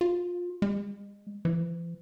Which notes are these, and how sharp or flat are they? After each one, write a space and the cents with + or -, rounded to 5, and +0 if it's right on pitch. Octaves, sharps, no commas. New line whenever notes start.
F4 +20
G#3 -30
E3 +45